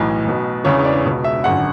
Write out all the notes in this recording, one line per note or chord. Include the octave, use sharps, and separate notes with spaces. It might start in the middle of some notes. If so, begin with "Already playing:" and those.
Already playing: B1 A2 E3
B1 B2
E1 E2 C#3 E3 C#5
D5
C#2 B2
E5
G#1 F#2 D3 F#5